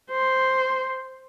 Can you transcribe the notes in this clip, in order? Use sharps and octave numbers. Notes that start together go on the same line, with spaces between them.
C5